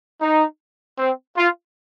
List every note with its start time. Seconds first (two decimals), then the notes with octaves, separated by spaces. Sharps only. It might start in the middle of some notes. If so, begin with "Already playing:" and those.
0.21 D#4
0.98 C4
1.37 F4